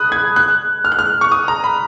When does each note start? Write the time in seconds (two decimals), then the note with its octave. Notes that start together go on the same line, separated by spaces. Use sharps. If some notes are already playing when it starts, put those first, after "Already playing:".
Already playing: B5 D#6 F#6
0.12 G#6
0.36 F#6
0.85 F6
0.92 F#6
0.99 F6
1.21 C#6
1.32 D#6
1.48 A#5
1.64 B5